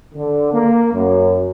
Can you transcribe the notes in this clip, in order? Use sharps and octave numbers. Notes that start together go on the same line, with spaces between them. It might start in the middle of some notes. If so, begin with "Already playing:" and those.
D3
A#3
F#2